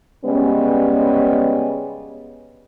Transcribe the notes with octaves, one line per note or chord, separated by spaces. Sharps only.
C#3 G3 G#3 B3 C#4